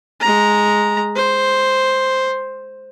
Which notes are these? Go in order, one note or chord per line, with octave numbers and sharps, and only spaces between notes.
G#3 A#5
C5